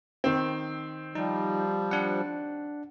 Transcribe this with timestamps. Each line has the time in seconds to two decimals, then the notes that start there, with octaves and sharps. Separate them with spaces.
0.24 D#3 C4
1.15 F3 G3 D#4
1.91 D4 F#5